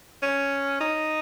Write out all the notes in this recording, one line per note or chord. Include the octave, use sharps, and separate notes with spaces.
C#4
D#4